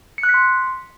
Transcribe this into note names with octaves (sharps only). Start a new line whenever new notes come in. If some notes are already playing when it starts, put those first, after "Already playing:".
C#7
F#6
B6
C6